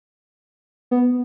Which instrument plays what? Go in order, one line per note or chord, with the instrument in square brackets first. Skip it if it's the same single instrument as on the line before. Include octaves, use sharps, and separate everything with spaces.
[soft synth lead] B3